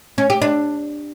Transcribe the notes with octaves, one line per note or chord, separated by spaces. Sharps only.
C#4
G4
D4